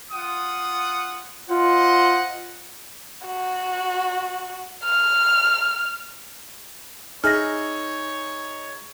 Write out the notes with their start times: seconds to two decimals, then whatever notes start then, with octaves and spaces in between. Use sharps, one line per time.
0.12 F4 F#5 D#6
1.50 F4 C5 D#5 F#5
3.27 F#4
4.85 F6
7.24 D#4 G#4 C#5 E5 B5 F6 A#6